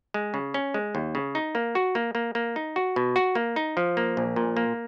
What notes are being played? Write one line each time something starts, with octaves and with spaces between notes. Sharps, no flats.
G#3
C#3
C#4
G#3
D#2
C#3
D#4
A#3
F#4
A#3
A#3
A#3
D#4
F#4
B2
F#4
A#3
D#4
F3
A#3
A#1
A#2
A#3